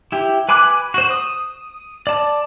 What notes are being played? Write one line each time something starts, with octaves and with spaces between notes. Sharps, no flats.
E4 G4
B4 G#5 B5 D6 F#6
F#4 C5
D#6
D5 A5